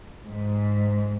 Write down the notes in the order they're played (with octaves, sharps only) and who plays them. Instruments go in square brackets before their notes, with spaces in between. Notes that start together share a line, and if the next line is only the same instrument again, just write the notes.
[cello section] G#2